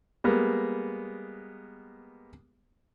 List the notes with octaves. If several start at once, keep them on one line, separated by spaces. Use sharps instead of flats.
G3 G#3 A#3 B3